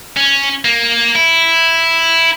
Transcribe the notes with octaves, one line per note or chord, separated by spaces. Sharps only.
C#4
A#3
E4